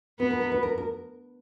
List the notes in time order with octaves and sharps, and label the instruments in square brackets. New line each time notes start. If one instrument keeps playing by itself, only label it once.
[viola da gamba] B3 [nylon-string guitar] B4
[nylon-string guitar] A#4
A#4
B4
A#4
A#4